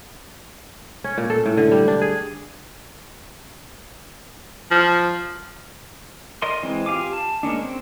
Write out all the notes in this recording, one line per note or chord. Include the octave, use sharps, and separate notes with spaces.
C#4
A#2
A4
A2
D3
G3
D4
G#4
F3
A#4 D5 D#5 C6
E3 G#3 C4
F4 G4 F5 G#5 D6
A5
G#3 A#3 C#4 D4
C4